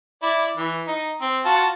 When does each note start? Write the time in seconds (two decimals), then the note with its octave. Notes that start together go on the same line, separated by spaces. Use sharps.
0.23 E4 D5
0.57 E3
0.88 D#4
1.22 C4
1.45 F4 F#4 A5